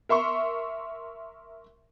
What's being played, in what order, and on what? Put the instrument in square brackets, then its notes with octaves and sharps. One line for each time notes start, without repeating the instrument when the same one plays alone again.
[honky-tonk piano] A#4 E5 C6 C#6